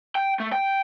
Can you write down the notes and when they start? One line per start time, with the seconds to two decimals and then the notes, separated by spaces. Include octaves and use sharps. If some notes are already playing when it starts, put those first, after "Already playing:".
0.15 G5
0.40 A3
0.52 G5